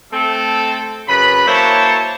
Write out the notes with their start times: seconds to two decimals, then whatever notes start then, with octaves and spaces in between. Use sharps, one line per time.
0.12 A3 C4 A4
1.08 F#2 C#3 B4 B5
1.47 F#3 A#3 E4 C5 C#5 A5